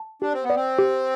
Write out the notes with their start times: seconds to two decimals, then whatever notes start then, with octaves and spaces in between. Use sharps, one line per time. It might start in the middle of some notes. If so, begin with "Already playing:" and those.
Already playing: A5
0.22 D4 G4
0.33 C4
0.44 B3
0.50 D5
0.56 C4
0.79 G4